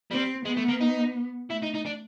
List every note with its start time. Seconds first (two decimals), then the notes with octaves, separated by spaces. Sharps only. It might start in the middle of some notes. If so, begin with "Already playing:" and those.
0.11 G3 C4
0.45 G#3 B3
0.57 A3
0.69 A#3
0.81 D#4
1.50 A3 E4
1.62 D#4
1.74 D#4
1.85 D4